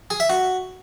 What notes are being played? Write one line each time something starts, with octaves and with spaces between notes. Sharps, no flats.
G#4
E5
F#4